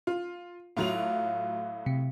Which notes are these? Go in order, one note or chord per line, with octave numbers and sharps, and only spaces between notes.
F4
A2 F#3 F4 F7
C3